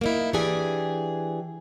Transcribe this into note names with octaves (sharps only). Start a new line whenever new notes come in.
A#3 D#4 E4
E3 D4 G4 G#4 G#5